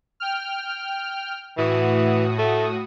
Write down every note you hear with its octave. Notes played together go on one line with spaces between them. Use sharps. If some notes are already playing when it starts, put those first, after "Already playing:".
G5 F6
A2 E3 F#4 D#6
A3